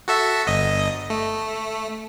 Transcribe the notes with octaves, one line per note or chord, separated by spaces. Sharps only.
F#4 A4 E5
G1 D#5
A3